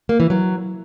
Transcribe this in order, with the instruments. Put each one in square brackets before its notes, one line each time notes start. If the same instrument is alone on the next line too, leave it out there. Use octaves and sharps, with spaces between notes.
[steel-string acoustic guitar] A#3
E3
F#3